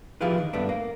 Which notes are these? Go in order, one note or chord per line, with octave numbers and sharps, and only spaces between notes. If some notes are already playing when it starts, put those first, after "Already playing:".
F3 E4 F4 G4 G#4 B4
D#3
G2 A3 B3 D4
A#3